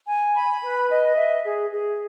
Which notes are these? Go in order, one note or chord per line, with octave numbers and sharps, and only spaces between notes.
G#5
B5
B4
D#5
E5
G#4
G#4